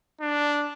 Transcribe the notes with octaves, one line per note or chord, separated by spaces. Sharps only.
D4